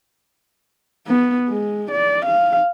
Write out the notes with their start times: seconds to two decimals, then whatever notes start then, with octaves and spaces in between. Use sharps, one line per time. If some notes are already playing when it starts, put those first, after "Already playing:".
1.07 B3
1.49 G#3
1.91 D5
2.26 F5